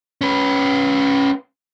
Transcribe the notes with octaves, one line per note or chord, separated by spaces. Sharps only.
C#4 B4